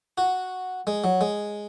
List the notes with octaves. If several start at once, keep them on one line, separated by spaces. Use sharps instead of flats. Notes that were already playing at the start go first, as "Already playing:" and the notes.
F#4
G#3
F#3
G#3